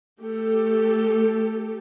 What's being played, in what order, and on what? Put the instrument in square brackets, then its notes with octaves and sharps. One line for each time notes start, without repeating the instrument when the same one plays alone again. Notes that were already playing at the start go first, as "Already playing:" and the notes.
[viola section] A3 G4 A4